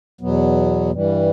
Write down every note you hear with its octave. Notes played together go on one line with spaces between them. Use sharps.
E2 B2 F#3 B3
G2 E3 G3